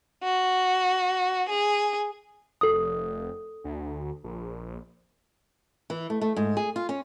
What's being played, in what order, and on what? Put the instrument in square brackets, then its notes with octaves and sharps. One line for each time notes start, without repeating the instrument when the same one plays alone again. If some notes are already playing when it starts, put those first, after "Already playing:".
[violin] F#4
G#4
[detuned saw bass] F1 [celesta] A4 D#6
[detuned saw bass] D2
A#1
[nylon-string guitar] E3
A3
A3
G#2
G#4
F4
C#4